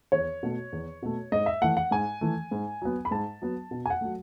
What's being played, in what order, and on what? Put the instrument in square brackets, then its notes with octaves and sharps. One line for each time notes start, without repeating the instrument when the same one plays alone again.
[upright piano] E2 C#5
B2 A3
E2
B2 A3
G#2 D#5
E5
E3 A3 F#5
F#5
G#2 G#5
E3 A3
G#2
F#3 B3
B5
G#2 A5
F#3 B3
B2
G#5
F#5
F#3 A3